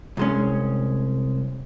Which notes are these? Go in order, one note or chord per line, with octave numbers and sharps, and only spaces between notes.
C2 G#3 C#4